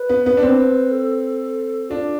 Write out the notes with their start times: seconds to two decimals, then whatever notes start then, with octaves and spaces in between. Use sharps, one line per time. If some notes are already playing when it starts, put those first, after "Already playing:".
Already playing: B4
0.09 B3
0.26 B3
0.37 D4
0.43 C4
0.92 A4
1.90 D4 F4